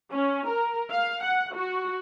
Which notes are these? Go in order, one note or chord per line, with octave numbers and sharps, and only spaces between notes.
C#4
A#4
F5
F#5
F#4